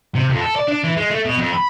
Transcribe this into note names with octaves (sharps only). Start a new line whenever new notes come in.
C3
F2
A4
D5
D4
E3
G#3
A3
B2
F2
B5